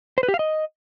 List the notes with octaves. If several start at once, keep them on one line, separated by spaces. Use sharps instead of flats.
C5
B4
G4
F5
D#5